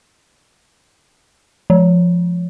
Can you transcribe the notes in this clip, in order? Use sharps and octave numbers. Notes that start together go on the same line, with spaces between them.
F3